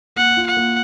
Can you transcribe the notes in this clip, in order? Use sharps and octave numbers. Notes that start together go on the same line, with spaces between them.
A#3 F#5
F4
F#5
A#3